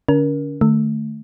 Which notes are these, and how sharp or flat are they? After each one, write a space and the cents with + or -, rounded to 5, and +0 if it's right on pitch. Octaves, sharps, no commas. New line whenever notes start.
D3 +0 C#4 +40 A#4 +25
D#3 -40 A3 +0